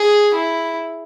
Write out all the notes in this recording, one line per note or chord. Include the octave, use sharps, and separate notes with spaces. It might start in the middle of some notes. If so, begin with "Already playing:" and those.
Already playing: G#4
E4